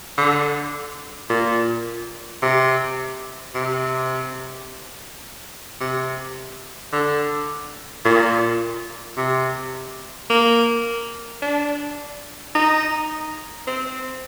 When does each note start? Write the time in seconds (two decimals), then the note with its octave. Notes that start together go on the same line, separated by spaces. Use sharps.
0.18 D3
1.30 A#2
2.42 C3
3.55 C3
5.80 C3
6.92 D3
8.05 A#2
9.17 C3
10.29 A#3
11.42 D4
12.55 D#4
13.67 C4